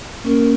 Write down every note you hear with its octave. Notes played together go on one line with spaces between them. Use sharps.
A#3 C#4 A#4